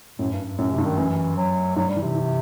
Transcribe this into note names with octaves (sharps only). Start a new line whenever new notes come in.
F#2 A2
G2
G2
F#2 A2
C3
G2
D#3
F#2 E3
F#3
G2 F#3
G3
E3
C3
E3